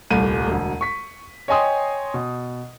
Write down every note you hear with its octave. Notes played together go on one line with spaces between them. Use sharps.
D#1 C2 A3 D#7
E1 D2
C#6 B6
C#5 D#5 G5 G#5 C6 D#6
B2